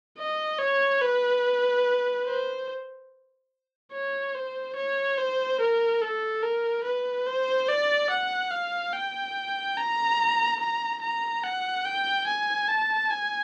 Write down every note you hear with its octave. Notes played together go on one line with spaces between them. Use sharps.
D#5
C#5
B4
C5
C#5
C5
C#5
C5
A#4
A4
A#4
B4
C5
D5
F#5
F5
G5
A#5
A#5
A#5
F#5
G5
G#5
A5
G#5